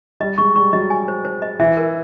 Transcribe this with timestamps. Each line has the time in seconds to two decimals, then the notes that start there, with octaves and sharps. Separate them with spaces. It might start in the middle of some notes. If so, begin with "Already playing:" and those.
0.20 G3 D#5
0.38 G#3 C#6
0.55 G3 C#6
0.73 F#3 D#5
0.90 G#5
1.08 C5
1.25 C5
1.42 D#5
1.59 E3 E5
1.77 A#4